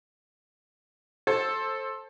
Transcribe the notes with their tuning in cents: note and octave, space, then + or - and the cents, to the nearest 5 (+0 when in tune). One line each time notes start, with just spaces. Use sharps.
A4 +0 C5 +25